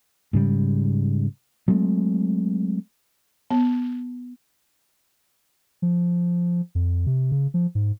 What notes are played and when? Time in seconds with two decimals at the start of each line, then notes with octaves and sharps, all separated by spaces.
0.33 G#2 C#3 G3
1.68 F#3 G#3 A3 C4
3.50 B3
5.82 F3
6.75 F2
7.07 C3
7.32 C#3
7.54 F3
7.75 G#2